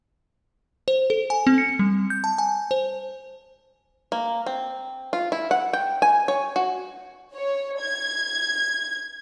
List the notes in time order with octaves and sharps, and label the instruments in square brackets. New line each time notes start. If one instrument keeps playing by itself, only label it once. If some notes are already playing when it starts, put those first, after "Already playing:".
[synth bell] C5
A4
G#5
C4
C#7
G3
G6
A5
G#5
C5
[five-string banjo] A#3
C4
F4
E4
F#5
G5
G#5
C#5
F#4
[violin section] C#5
G#6